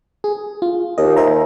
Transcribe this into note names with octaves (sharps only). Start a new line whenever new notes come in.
G#4
F4
D#2 D#5
C5 E5 A#5